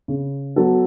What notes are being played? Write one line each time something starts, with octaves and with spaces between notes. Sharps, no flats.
C#3
F#3 B3 F#4 A4